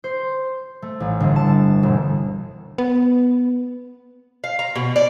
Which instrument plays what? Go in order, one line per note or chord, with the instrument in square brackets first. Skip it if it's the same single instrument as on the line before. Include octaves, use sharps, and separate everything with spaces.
[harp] C5
A3
A1
G1
A5
E1
[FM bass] B3
[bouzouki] F5
A#5
B2
D5